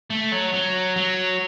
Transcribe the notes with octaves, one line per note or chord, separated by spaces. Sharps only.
A3
F#3
F#3
F#3